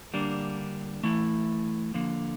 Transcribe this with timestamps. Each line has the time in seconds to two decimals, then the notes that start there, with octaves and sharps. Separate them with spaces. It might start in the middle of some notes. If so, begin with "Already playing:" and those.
0.14 D3 G3 A#3 D4
1.03 E3 A3 E4
1.94 D3 F3 A#3